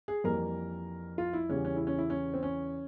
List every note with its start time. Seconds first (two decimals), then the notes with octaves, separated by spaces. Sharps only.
0.08 G#4
0.24 F2 E3 G3 A#3 A#4
1.18 F4
1.33 E4
1.49 E2 C#3 E3 G3 C#4
1.65 C#4
1.76 E4
1.87 C#4
1.98 E4
2.10 C#4
2.34 C4
2.43 C#4